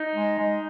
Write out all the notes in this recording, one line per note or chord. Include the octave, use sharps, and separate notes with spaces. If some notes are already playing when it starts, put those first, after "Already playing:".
Already playing: D#4
G#3
G#3